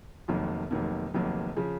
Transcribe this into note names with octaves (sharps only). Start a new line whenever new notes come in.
F1 F2 D#3 F#3 A#3
F1 F2 D#3 F#3 A#3
F1 F2 D#3 F#3 A#3
C#3 F3